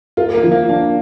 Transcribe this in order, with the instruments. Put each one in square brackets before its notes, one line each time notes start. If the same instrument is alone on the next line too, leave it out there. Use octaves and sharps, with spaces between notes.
[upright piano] F4 [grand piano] A#4
[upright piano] A#3
[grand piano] F3
[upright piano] A#3
[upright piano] A#3 [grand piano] D4